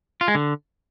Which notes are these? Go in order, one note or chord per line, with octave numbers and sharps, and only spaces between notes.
F4
G#3
D3